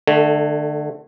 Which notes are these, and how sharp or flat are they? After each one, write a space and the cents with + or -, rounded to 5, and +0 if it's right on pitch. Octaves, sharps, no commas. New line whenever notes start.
D3 +30 A3 +0